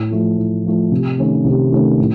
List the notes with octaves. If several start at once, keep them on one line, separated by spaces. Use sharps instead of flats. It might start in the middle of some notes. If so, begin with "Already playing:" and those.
Already playing: A2
F3 A3
A2
F3 A3
C3
D#3 A3 C#4
C3
D#3 A3 C#4
A2